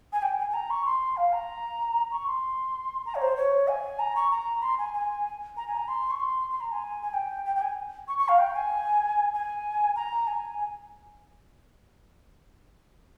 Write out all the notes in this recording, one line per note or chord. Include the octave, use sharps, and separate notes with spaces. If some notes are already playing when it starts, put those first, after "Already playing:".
G#5
G5
G#5
G#5
A#5
C#6
C6
F5
A#5
C#6
C6
A#5
C#5
C5
C#5
G#5
A#5
C#6
A#5
C6
G#5
G#5
A#5
G#5
A#5
C6
C#6
C6
C6
A#5
G#5
G#5
G5
G5
G5
G#5
C#6
C#6
F5
G5
G#5
G#5
A#5
G#5
G#5